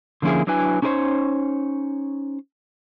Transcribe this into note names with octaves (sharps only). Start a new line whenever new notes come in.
D3 F3 A#3 C#4 E4 G#4
F#3 D4 E4 B4 G#5
C#4 D#4 G4 A#4 C5 C#5